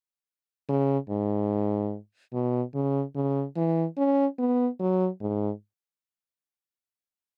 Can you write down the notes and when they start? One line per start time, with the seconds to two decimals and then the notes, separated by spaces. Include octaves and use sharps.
0.69 C#3
1.10 G#2
2.33 B2
2.74 C#3
3.15 C#3
3.56 E3
3.97 C#4
4.39 B3
4.80 F#3
5.21 G#2